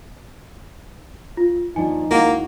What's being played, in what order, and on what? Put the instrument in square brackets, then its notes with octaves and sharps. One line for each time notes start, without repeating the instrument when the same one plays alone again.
[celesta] F4
[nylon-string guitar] D#2 F3 D4 [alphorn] D#4 [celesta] G#5
[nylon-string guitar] D#2 G#3 F#4 [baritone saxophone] A#3 [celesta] E4 F#5